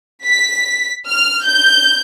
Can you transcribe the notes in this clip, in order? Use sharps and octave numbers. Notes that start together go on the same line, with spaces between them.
B6
F6
G6